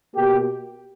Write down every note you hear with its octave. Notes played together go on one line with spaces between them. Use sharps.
B2 A#3 G4